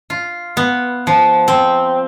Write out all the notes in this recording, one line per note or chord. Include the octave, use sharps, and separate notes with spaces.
F4
B3
F3
C4